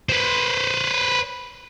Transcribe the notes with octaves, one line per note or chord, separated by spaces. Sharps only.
B4 C5